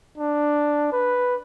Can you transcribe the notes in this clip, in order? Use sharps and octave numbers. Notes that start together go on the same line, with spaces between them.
D4
B4